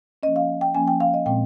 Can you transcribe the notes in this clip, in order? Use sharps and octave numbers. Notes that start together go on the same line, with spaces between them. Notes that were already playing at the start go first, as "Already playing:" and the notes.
F3 A#3 C#4 D#5
F5
G5
F3 A#3 C#4 G#5
G5
F5
D#5
A#2 G#3 C4 G5